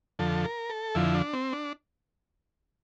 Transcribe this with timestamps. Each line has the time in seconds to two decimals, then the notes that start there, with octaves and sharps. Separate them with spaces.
0.19 F2 D3 F3 A4
0.44 A#4
0.70 A4
0.95 F2 D3 F3 E4
1.15 D4
1.33 C4
1.53 D4